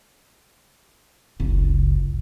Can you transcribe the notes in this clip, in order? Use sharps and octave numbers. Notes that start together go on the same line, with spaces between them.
F#1 C#2